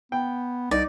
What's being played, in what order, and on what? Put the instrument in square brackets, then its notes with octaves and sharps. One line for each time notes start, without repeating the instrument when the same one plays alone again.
[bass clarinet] B3 [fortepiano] G5
[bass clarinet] C2 [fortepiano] D#4 [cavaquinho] D5